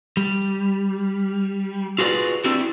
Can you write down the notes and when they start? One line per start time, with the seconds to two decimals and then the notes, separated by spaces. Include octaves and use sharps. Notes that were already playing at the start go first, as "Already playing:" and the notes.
0.17 G3
1.98 F4 F#4 G#4 B4 D5
2.44 C4 D4 E4 F#4 G4